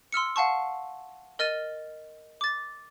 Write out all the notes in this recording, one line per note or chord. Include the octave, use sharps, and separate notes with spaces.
C6 E6 F6 C#7
F5 F#5 A5 C#6
A#4 D#5 F6 A6 D#7
D6 A6